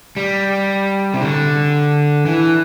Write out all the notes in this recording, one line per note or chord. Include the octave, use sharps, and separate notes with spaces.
G3
C3
D3
E3